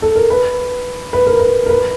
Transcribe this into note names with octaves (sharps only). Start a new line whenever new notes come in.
A4
A#4
B4
B4
A#4
B4
A#4
B4